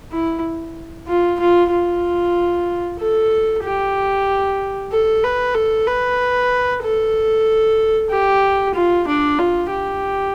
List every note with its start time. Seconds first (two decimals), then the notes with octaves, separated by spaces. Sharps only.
0.11 E4
1.08 F4
1.40 F4
1.71 F4
2.99 A4
3.64 G4
4.92 A4
5.23 B4
5.55 A4
5.87 B4
6.83 A4
8.10 G4
8.74 F4
9.07 D4
9.38 F4
9.70 G4